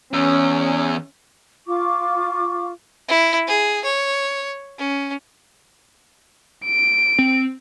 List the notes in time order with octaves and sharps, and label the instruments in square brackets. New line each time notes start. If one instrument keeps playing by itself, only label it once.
[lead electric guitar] E2 [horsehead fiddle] C#4
[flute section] F4 F5 C#6 D6
[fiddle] E4
G#4
C#5
C#4
[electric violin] D7
[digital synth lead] C4